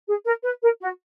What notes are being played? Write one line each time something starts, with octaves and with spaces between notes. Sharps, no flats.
G#4
A#4
B4
A#4
F#4